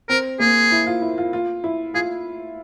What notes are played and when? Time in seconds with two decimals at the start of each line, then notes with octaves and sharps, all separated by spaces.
0.09 C4 A#4
0.40 A#3 G#4
0.72 E4
0.87 F4
1.02 E4
1.18 F4
1.33 F4
1.64 E4
1.94 F4 G#4